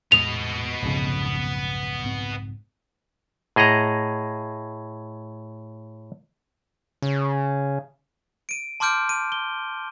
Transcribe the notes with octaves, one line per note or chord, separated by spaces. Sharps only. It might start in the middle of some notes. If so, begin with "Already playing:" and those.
E2 A2 G#3 B3 D#5 F7
B1 F2 G#2 C#3
G#2 C4
A2 G#4 D#5 F#5 A#5
C#3
D7 D#7
A5 C6 D6 F6 G6 D7
D#7
G7